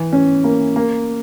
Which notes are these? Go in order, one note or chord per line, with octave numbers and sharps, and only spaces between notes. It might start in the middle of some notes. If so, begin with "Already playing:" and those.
Already playing: E3
C#4
A#3
A#3